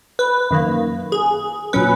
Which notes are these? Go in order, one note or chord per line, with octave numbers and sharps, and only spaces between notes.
B4
F#2 D#3 A#3
G#4
A#2 F#3 C#4 B4